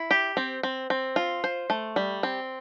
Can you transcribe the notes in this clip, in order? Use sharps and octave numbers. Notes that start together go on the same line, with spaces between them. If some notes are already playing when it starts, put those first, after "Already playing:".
Already playing: E4
G4
C4
C4
C4
F4
C5
A3
G3
C4